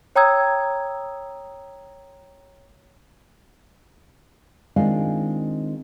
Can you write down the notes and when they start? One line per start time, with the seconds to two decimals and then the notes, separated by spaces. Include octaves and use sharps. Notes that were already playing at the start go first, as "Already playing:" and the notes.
0.16 C#5 G5 A#5 D#6 E6 G#6
4.76 D#3 G#3 C4 D4 F4 F5